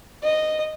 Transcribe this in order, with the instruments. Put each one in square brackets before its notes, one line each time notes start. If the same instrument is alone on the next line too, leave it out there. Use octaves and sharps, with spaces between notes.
[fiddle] D#5